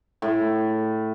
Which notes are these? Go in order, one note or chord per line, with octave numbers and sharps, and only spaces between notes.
A2